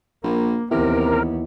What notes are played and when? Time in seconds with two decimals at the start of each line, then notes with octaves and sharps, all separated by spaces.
0.24 A#1 A#3
0.71 D#2 C3 E3 B3 E4 A#4